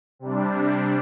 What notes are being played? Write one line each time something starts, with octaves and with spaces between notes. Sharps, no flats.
C3 G3 D4